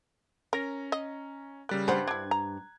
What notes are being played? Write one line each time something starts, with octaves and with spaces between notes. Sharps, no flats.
C#4 A#4 A#5 A#6
D#5
C#3 G3 A#3 F#6
G2 C5 F#5
D4 E4 G#6
A#5